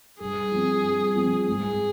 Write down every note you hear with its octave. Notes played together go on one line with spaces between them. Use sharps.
G2 G#4
F3 C4
G2
F3 C4
G#2 G#4